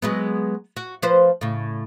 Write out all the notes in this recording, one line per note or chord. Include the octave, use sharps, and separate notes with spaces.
F#3 G#3 B3
F#4
F3 B4 C5
A2 C#3